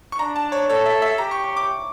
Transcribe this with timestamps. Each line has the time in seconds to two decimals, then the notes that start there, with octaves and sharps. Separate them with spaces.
0.12 C#6
0.19 D4 A#5
0.36 A5
0.52 C#5
0.68 A4 C#5
0.86 E5
1.02 E5
1.18 G4 A#5
1.31 C#6
1.44 C#6
1.56 D6